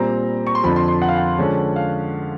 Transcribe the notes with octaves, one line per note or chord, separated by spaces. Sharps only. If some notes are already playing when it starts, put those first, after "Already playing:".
Already playing: A#2 G3 C4 A#5
C#6
C6
F2 D3 F3 B5
C6
C6
F#5
F5
F#5
D3 F3 G#3 C#4
F5